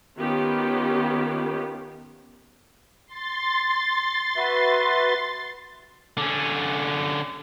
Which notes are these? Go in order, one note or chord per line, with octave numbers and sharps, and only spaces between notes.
D#3 B3 C#4 F4 G4
C6 A6
F#4 B4 E5
D3 C#4